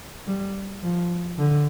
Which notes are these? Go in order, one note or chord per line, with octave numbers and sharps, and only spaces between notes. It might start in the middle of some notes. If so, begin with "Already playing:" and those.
G3
F3
D3